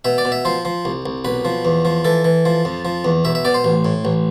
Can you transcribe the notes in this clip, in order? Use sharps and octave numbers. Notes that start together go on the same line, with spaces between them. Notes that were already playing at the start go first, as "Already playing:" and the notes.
B2 E5
D5
B2
E5
F3 C5
F3
C2
C2
B1 B4
F3
E2
F3
E3 A4
E3
F3
F2
F3
E2
B1 E5
E5
B2 D5
C5
A1
A2
A1